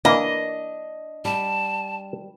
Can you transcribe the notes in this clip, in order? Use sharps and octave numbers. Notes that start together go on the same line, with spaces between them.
E3 A#3 D4 D#5
G3 A5